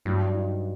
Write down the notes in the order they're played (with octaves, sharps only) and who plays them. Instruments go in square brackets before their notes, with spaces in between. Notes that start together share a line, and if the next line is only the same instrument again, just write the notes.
[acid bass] G2 [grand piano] F#3
[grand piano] D#4